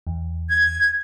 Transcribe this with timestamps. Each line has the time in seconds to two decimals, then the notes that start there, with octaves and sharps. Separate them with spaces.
0.07 E2
0.50 G#6